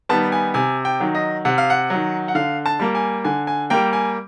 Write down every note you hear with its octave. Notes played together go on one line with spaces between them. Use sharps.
D#3 G3 B3 A5
G#5
C3 G#5
G5
D#3 F#3
D#5
C3 F#5
F5
F#5
D#3 F#3
F#5
D3 F5
A5
G3 A#3
G#5
D3 G#5
G#5
G3 A#3 G5
G#5